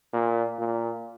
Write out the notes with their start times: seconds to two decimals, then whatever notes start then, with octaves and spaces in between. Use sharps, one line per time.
0.13 A#2
0.58 A#2